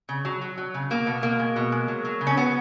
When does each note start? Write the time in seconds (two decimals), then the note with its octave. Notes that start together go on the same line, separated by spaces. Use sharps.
0.09 C#3
0.25 F#3
0.41 F#3
0.57 F#3
0.74 C#3
0.90 B2 A#3
1.06 B2 B3
1.22 B2 A#3
1.39 G#3
1.56 B2
1.72 G#3
1.88 F#3
2.05 F#3
2.21 C#3
2.27 C#4
2.37 F#3 B3